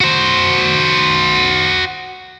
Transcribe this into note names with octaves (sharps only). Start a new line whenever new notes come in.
F#4 C5